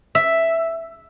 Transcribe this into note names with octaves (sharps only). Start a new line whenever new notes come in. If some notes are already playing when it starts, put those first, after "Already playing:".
E5